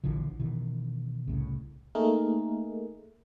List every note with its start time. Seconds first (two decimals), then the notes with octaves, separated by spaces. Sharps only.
0.04 A#1 D3 E3 F3
0.40 B2 D#3 E3
1.28 C2 A2 C#3
1.95 A3 A#3 D#4 G#4 A#4